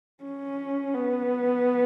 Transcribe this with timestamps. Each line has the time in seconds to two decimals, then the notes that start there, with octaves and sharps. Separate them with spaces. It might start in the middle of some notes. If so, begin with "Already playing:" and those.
0.24 C#4
0.94 B3